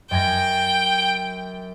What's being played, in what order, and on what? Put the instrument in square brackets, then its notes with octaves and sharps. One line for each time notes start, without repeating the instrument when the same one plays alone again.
[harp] F#2 G#5 A#6 [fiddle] G5